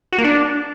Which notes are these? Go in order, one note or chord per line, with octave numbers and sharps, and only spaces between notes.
F#4
A#3
D4